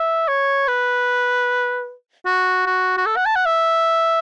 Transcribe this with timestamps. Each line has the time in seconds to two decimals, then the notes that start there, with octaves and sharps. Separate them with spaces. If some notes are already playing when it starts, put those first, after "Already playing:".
Already playing: E5
0.28 C#5
0.68 B4
2.26 F#4
2.66 F#4
2.97 F#4
3.06 A4
3.16 F#5
3.26 A5
3.36 F#5
3.46 E5